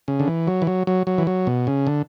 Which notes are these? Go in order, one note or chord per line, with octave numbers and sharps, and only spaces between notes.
C#3
D3
E3
F#3
E3
F#3
F#3
F#3
E3
F#3
B2
C#3
D3